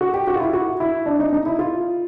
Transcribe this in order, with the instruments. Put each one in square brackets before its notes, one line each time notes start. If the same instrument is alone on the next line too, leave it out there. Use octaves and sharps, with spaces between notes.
[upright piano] F#4
G4
F#4
F4
E4
F#4
E4
D4
D#4
D#4
E4
F4